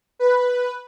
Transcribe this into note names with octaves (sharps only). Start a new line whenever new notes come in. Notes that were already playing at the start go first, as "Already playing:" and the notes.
B4